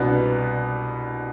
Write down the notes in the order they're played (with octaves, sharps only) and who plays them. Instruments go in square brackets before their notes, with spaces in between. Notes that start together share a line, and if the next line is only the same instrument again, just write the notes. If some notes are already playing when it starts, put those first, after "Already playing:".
Already playing: [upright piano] C2 B2 B3 D4